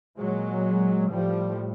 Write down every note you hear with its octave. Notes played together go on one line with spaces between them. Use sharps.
A#2 F#3 G#3
A2 F3 G3